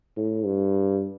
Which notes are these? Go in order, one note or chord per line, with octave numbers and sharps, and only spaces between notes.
A2
G2